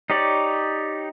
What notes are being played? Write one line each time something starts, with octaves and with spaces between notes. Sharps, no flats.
D#4 G4 C#5 D5